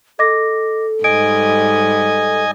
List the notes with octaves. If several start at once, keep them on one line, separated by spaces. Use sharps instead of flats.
A4 D#5 D6 A#6
G#2 G3 D#5 G#5 D7